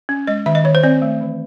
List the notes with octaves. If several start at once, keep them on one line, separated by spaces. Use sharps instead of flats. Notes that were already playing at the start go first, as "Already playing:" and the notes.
C#4
G#3 D#5
D#3 E5
D#5
D#3 C#5
C5
C4 D5
A3
E3